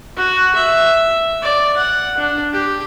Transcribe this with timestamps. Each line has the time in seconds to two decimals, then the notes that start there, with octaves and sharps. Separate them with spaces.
0.16 F#4
0.55 E5
1.42 D5
1.77 F#5
2.17 D4
2.53 G4